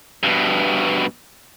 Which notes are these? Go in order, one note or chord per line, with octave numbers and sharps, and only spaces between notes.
G2 B2